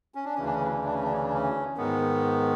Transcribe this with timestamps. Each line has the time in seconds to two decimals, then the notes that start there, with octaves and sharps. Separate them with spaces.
0.15 C#4
0.25 D4
0.35 D2 C#3 E3 C#4
0.45 D4
0.54 C#4
0.64 D4
0.74 C#4
0.84 D4
0.94 C#4
1.03 D4
1.13 C#4
1.23 D4
1.34 C#4
1.77 G#2 D#3 B3